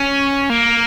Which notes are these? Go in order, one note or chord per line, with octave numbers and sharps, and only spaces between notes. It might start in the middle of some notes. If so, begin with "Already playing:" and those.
Already playing: C#4
A#3